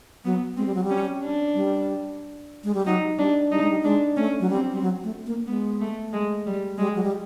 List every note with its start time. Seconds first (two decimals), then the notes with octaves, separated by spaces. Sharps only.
0.25 F#3 B3
0.57 G#3 C4
0.66 G3
0.75 F#3
0.84 G3
0.90 C#4
1.23 D4
1.55 G3
2.64 G#3
2.74 G3
2.86 F#3 D#4
3.18 G3 D4
3.51 G3 D#4
3.60 G#3
3.70 G3
3.84 G#3 D4
4.17 A3 C#4
4.40 F#3
4.49 G3 C4
4.72 G3
4.81 F#3
5.04 A3
5.26 A#3
5.47 G#3 B3
5.81 A3
6.13 G#3
6.46 G3
6.78 G3 G#3
6.95 F#3
7.03 G3